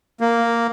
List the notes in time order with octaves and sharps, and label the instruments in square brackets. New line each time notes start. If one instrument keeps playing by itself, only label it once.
[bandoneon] A#3